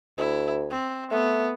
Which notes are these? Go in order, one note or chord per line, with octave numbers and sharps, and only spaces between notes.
D2 E4
C4
A3 B3